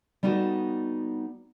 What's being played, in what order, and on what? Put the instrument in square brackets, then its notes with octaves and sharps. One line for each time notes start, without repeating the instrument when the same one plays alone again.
[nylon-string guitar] G3 B3 D#4 F#4 A4